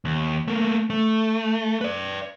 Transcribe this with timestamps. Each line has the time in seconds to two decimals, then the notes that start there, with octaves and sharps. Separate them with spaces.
0.05 D#2
0.48 A3 A#3
0.90 A3
1.81 B4 D5